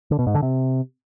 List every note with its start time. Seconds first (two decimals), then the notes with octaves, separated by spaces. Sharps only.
0.11 D3
0.19 B2
0.27 G#2
0.35 D3
0.42 C3